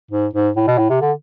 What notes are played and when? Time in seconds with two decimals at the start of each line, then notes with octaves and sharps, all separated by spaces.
0.11 G#2
0.33 G#2
0.56 A2
0.67 B2
0.78 A2
0.90 C3
1.01 D3